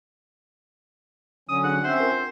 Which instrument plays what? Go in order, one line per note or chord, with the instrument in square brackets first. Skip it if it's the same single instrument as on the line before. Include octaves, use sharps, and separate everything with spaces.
[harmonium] D3 F#3 C#4 [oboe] D#6
[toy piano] D4 G#4 F5 [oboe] F#5
[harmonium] C4 C#4 E5 [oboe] C5 [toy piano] F#5
[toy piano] F4 A#4